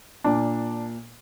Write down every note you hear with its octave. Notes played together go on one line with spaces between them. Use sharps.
A#2 D4